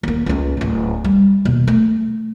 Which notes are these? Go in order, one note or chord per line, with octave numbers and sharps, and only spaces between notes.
D#2 A#3
C#2 C#4
D1 C#4
G3
D#2 B2
A3